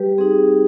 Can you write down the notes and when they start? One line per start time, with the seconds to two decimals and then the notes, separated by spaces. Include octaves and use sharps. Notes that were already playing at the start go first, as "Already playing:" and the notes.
Already playing: G3 G4 B4
0.18 C4 D#4 G#4